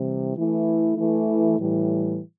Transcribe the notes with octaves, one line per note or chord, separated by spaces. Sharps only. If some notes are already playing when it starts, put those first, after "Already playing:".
Already playing: C3 E3 G3
E3 A3 E4
E3 A3 E4
A2 E3 G3